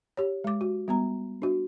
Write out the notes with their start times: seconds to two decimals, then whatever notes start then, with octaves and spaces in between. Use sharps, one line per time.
0.17 G4 C#5
0.44 G#3 D6
0.61 F#4
0.88 G3 B3 A#5
1.42 D4 F#4